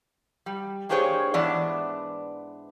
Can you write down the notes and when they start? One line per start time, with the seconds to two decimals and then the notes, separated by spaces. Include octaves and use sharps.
0.46 G3
0.89 A#3 D4 G4 G#4 C5 C#5
1.34 G#2 E3 B3 D4 D5